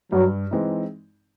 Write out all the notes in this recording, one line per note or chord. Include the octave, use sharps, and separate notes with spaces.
G2 F#3
E3 G#3 C4 D#4